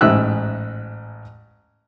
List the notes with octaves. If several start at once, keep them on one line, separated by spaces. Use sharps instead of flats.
A1 G#2 E5 E6 F#6